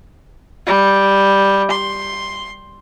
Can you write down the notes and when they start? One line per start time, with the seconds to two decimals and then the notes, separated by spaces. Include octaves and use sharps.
0.66 G3
1.71 C6